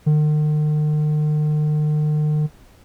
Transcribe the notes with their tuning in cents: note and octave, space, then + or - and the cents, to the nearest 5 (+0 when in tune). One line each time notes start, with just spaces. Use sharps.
D#3 -45